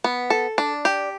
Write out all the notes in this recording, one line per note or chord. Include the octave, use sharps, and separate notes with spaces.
B3
A4
D4
G4